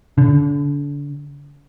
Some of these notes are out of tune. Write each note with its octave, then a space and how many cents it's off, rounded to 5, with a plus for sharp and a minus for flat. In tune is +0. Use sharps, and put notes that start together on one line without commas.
D3 -35